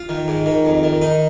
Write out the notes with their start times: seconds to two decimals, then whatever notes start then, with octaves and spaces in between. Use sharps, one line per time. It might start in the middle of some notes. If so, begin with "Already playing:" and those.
Already playing: F4
0.09 D#3
0.28 G#2
0.46 D#3
0.65 F2
0.83 D#3
1.01 D#3 D#4